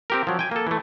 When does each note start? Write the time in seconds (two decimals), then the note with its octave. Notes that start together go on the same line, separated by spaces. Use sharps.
0.10 C4 G4 A#4
0.27 F3 F#3
0.39 G5 G#5
0.51 A#3 A4
0.67 E3 A3